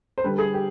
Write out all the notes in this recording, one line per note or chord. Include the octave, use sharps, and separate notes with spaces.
C5
D3 G3 B4
G#4
G4